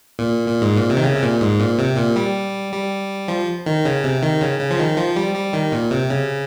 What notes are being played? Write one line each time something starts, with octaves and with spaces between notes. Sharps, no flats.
A#2
A#2
G#2
A#2
C3
D#3
C#3
C3
A#2
G#2
A#2
C3
A#2
G3
G3
F3
D#3
C#3
C3
D#3
C#3
C#3
F3
D#3
F3
G3
G3
D#3
A#2
C3
C#3